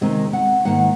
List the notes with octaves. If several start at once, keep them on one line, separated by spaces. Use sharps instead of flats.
C3 D#3 G#3 C4 D#4 D#5
F#5
G#2 D#3 A#3 F#5